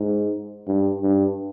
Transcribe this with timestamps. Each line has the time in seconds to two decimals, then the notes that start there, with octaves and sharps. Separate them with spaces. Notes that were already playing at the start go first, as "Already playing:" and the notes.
Already playing: G#2
0.68 G2
1.02 G2